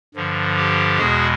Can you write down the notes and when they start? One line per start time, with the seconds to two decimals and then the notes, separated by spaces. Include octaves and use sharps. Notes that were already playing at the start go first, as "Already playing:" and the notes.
0.14 G2 D3 F3
0.57 G4
0.98 E2 B2 G#3 F#4 G#4